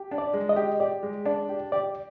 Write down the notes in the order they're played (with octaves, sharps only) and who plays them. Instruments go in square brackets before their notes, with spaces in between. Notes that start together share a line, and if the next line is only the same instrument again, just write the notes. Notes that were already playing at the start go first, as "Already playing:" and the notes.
Already playing: [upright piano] G4
D4
[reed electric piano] D5
[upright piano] G#3
[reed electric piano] D#5
[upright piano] G4
[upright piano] G4 [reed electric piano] D5
[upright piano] G#3
[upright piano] D4 [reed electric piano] D5
[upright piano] G4
[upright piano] G4 [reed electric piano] D5